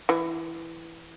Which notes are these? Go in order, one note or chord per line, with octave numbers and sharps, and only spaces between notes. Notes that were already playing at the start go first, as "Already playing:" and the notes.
E3